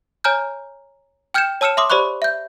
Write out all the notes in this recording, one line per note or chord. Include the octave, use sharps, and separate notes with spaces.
C#5 G#5 A#5 F6 G6
G5 F6 G6 G#6 C#7 E7
C#5 A5 E6 F6 C#7 E7
E5 C6 D6 D#6
G4 C5 D5 B5 C#6 F#6
E5 G6